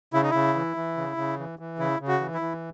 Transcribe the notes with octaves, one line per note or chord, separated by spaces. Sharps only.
C#3 E4
D#4
C#3 E4
E3
E3
C#3
C#3
E3
E3
C#3 E4
C#3
F#4
E3
E4
E3